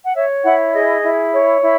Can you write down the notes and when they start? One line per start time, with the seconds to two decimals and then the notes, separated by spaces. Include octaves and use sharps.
0.04 F#5
0.14 C#5 E5
0.43 E4 F#5
0.73 G#4 D#5
1.02 E4
1.32 C#5
1.61 E4